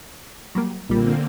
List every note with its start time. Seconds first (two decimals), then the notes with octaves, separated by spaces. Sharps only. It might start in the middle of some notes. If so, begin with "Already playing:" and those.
0.55 F#3 G3 A#3
0.89 B1 A#2 D3 G3 A#3 C4